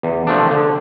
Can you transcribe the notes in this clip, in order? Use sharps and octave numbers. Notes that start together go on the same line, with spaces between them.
E2
C3 F3 A3 D4
D3